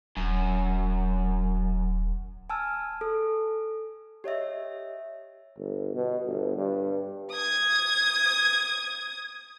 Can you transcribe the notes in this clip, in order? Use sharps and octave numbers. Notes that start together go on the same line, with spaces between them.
D#1 F#2
G#5 A5 E6 F6
A4
G4 C#5 D#5 E5
G1
B2
G1
G2
D#6 G#6